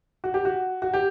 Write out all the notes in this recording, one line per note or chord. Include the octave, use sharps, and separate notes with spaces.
F#4
G4
F#4
F#4
G4